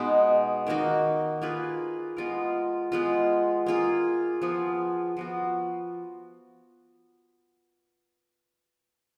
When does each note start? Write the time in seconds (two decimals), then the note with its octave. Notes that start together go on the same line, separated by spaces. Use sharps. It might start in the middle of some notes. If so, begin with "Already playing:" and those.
Already playing: B2 G#3 B3 D#4
0.67 D#3 A#3 D#4 F#4
1.42 A#3 F4 G#4 B4
2.17 G#3 B3 F4 A#4
2.92 G#3 B3 F4
3.66 A#3 F4 G#4
4.42 F3 B3 F4 G#4
5.17 F3 B3 F#4